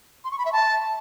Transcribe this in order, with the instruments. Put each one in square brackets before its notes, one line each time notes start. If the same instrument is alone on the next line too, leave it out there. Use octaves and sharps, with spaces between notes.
[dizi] C6
C#6
B5
E5
A5